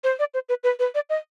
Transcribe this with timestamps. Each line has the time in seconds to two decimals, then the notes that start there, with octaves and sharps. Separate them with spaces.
0.04 C5
0.19 D5
0.34 C5
0.49 B4
0.64 B4
0.79 B4
0.95 D5
1.10 D#5